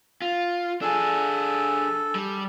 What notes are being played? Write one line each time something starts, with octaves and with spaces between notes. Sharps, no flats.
F4
D4 G#4 A4
G3